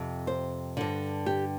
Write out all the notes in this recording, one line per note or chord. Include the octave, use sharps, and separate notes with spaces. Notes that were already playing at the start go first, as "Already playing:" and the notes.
Already playing: F2 C3
C5
G2 D3
G4